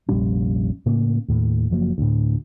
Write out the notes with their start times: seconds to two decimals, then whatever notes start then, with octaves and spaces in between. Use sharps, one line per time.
0.09 F1 A#1 G3 C#4
0.86 A2 C#3 A#3
1.28 D#2 A2
1.70 F#1 F3 F#3 A#3
1.98 D2 A2